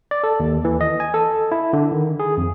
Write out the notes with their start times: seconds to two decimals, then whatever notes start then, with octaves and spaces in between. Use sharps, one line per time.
0.11 D5
0.24 A4
0.40 D#2
0.65 E3
0.81 D#5
1.00 G#5
1.14 A4
1.52 E4
1.73 D3
1.92 D#3
2.20 G#4
2.37 F2